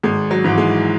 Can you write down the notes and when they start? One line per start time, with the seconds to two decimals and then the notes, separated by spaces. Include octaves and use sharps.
0.03 G#1 G#3
0.31 F#3
0.44 G#2 E3
0.58 G#3